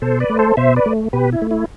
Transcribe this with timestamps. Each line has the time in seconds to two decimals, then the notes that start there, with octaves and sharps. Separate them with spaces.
0.02 B2 A4 C5
0.20 B4 D5
0.30 A3
0.39 A4 C5
0.57 B2 C5 E5
0.76 B4 D5
0.86 A3
1.13 B2 G4 B4
1.32 E4
1.42 A3
1.51 E4